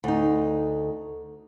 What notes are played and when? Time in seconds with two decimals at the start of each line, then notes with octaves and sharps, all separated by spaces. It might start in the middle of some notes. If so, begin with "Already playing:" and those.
0.04 D2 D#4